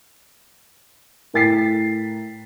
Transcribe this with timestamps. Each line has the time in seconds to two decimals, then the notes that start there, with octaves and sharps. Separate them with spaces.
1.34 A2 A#4 G5 A6 B6 C7